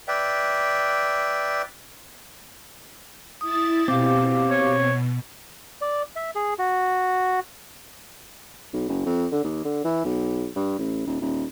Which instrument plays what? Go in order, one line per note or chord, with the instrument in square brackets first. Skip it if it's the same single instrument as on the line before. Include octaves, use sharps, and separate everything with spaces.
[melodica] B4 D5 E5 G5
[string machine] E4 A6 [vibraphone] D#6
[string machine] B2 [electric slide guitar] C4 [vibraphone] G4 F5 D6
[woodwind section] C#5
[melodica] D5
E5
G#4
F#4
[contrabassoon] B1
F#1
F2
D3
D#2
D3
E3
B1
G2
A1
D#1
D#1